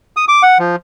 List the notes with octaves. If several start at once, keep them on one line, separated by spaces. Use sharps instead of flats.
D#6
D6
F#5
F3